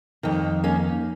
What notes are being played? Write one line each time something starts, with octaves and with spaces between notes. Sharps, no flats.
F2 D#3
A#3 C#4